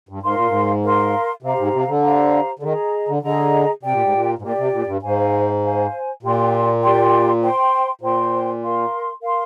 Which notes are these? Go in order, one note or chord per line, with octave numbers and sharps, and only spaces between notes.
G2
G#2 A#4 F5 C6
A#2
G#2
A#4 F5 C6
C3 G4 C5 F5 A#5
G#2
C3
D3
G4 C5 F5 A#5
D3
D#3 G#4 D#5 A#5
D3
D3 G#4 D#5 A#5
C3 G4 D5 G5
A#2
G#2
A#2
G#2
A#2 G4 D5 G5
C3
A#2
G2
G#2 C5 F5 G#5
C5 F5 G#5
A#2 G4 D5 G5 C6
G4 D5 G5 C6
C5 G5 C6
A#2 C5 G5 C6
A#4 F5 C6
A#4 F5 C6